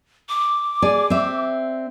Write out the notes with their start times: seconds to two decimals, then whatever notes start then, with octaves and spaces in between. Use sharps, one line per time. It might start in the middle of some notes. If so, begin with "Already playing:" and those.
0.29 D6
0.82 G#4 D5 G#5
1.10 C4 D5 E5